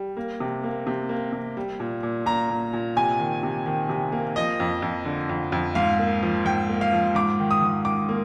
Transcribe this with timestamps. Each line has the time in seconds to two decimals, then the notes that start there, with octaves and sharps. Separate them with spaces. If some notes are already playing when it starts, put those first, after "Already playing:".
Already playing: G3
0.17 A#3
0.40 C3
0.63 A#3
0.87 C3
1.09 A#3
1.33 C3
1.57 G3
1.80 A#2
2.03 A#2
2.26 A#2 A#5
2.50 A#2
2.73 A#2
2.97 C3 G#5
3.20 D#3
3.43 C3
3.66 D#3
3.89 C3
4.12 A#3
4.36 F3 D#5
4.60 F2
4.82 F2
5.05 D3
5.29 F2
5.52 F2
5.75 G#2 F5
5.99 A#3
6.23 F3
6.45 G#2 G5
6.69 A#3
6.81 F5
6.92 F3
7.15 G#2 D6
7.39 D#3
7.51 D#6
7.62 G#2
7.85 D#3 D6
8.09 A#3